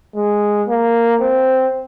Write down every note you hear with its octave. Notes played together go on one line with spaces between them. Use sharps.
G#3
A#3
C4